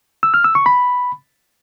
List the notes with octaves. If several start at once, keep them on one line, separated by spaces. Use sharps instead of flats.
E6
F6
E6
C#6
B5